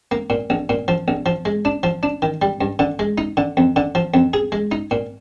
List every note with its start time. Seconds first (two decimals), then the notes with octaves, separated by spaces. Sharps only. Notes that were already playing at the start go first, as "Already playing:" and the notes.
0.11 A#3
0.30 A#2
0.50 A#1
0.69 A#2
0.88 F3
1.08 A#1
1.26 F3
1.45 G#3
1.65 D4
1.83 F3
2.03 D4
2.22 D#3
2.42 G3
2.61 G2
2.79 D3
2.99 G#3
3.18 D#4
3.37 D3
3.57 F2
3.76 D3
3.95 F3
4.14 F2
4.34 G#4
4.52 G#3
4.72 D#4
4.91 A#2